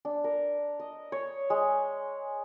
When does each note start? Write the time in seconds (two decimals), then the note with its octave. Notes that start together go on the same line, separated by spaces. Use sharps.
0.05 D4
0.24 A#4
0.80 D#5
1.12 C#5
1.50 G#3